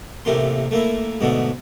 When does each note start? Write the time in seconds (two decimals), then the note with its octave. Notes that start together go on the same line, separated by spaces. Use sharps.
0.25 A1 C3 A3 A#3 C6
0.71 A3 A#3 E4
1.21 G#2 B2 D3 A3